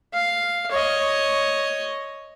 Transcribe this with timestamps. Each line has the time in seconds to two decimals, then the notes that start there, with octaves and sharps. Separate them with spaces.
0.13 F5
0.71 C#5 D#5